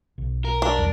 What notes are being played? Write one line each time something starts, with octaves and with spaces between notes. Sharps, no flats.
B1
A#4
D4
E2 F3 G3